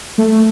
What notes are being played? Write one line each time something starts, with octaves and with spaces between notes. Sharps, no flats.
A3